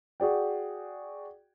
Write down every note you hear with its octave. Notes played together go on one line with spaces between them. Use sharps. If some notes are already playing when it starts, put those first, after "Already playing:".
F#4 G#4 D5 G5